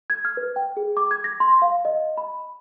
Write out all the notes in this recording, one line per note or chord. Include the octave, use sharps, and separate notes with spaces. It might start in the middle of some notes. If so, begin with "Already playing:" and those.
G#6
F6
B4
G5
G#4
D6
G#6
A#6
C6
F5
D#5
B5